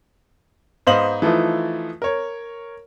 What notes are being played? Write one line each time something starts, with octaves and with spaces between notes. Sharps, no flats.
G#2 B3 C5 D#5 F5 F#7
E3 F3 A3 D#4 F4
A#4 C#5